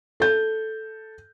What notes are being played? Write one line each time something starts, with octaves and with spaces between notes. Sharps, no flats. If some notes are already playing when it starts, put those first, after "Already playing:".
A4 G6